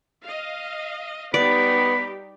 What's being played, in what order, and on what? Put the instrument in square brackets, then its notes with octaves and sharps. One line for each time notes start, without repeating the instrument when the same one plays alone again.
[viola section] D#5 F5
[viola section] G3 D#4 G4 [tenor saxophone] B3 [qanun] D5 [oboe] B5